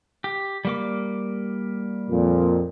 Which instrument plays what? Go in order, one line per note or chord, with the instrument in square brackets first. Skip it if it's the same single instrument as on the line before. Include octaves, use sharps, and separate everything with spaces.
[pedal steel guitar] G4
G3 A#3 D6
[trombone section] F2 A#2